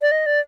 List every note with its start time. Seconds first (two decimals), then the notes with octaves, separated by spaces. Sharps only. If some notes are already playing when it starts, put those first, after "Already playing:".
0.02 D5
0.12 D#5
0.26 D5